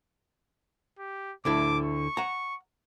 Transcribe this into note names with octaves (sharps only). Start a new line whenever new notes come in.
G4
D2 D3 E4 D6
C#6
F#5 A#5